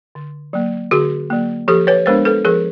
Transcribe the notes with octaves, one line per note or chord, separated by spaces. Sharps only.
D3
F#3 A#3
D3 F#4 G#4
F#3 A#3
F3 G4 A4
B4 C#5
G#3 B3 D4 A#4 C5
A4 B4
F3 G#4 A#4